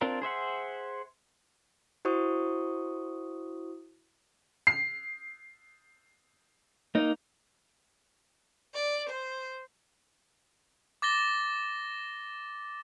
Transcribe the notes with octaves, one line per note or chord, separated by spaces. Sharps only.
C4 D4 F4 A#4
G#4 C5 E5 F#5
E4 F#4 C5 C#6 D#6
C7
A#3 D#4
D5
C5
D6 A6 A#6 G7